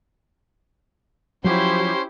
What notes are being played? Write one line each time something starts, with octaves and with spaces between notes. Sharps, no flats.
F3 F#3 C#4 E4 G4 C5 C6